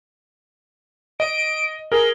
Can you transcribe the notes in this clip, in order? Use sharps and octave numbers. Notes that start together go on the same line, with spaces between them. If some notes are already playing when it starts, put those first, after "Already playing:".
D#5 D7
G#4 A#4 G7